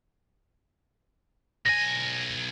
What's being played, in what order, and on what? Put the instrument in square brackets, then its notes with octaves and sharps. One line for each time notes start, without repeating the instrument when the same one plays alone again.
[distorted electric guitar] B1 G#5 [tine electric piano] A#6